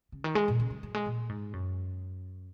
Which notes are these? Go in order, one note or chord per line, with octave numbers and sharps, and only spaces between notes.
C#3
D#3
G#3
A#2
C#3
F#3
F#3
G#3
A#2
G#2
F#2